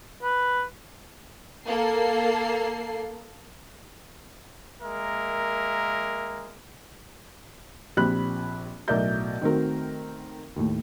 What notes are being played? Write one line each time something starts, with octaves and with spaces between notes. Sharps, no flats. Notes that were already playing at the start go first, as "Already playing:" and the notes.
B4
A#3 A4 C7
G#3 A#3 A#4 E5
A#1 C4 G4 B5 F#6
B1 A2 A#4 D5 E5 G6
D#3 A3 C4 F#4 A#4
D#2 A2